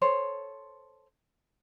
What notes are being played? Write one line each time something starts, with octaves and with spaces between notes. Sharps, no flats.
A4 C5 C#5